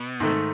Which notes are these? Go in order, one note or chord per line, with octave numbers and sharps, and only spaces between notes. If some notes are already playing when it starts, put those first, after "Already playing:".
Already playing: B2
G#2 D#3 A3 D#4 A4